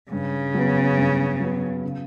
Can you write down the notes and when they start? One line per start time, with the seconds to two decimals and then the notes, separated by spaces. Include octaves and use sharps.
0.11 G2 C#3
0.54 F#3 B3
0.97 G2
1.40 F#3 B3
1.83 C#3